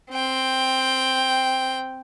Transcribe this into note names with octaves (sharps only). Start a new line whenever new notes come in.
C4 G5